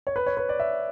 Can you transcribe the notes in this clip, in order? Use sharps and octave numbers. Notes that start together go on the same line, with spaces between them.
C#5
B4
C#5
B4
D5
E5